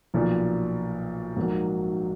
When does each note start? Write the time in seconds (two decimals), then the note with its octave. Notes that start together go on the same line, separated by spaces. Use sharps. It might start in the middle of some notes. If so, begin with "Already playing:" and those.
0.14 B1 A#2 F3
1.36 A#1 G#2 F#3 A#3